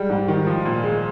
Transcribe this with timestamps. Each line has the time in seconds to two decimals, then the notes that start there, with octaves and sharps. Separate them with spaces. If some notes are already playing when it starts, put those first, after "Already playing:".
Already playing: G3 G#3
0.10 G#2
0.28 D#3
0.47 F3
0.65 A#2
0.84 G#3